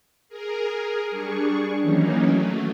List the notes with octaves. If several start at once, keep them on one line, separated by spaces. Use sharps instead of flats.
G#4 A#4
G3 D4 G#4 C#6
D#3 E3 F#3 A#3 C#4 D#4
F#3 A3